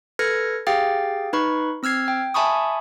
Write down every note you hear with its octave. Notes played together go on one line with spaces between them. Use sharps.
A4 B4 F6 G#6 A#6 C#7
G4 G#4 F5 G5 A6
D#4 B4 B5 C#6
C4 E6 F6 G#6 C7
G5
E5 G#5 A5 B5 C#6 D#6